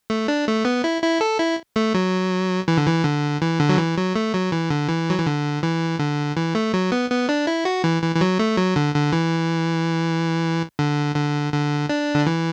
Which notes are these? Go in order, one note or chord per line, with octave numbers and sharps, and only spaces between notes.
A3
D4
A3
B3
E4
E4
A4
E4
A3
F#3
E3
D3
E3
D3
E3
D3
F#3
E3
F#3
A3
F#3
E3
D3
E3
F#3
E3
D3
E3
D3
E3
A3
F#3
B3
B3
D4
E4
F#4
E3
E3
E3
F#3
A3
F#3
D3
D3
E3
D3
D3
D3
D4
D3
E3